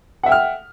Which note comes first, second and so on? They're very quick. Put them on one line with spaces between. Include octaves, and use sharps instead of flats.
F#5 E5 G5 F6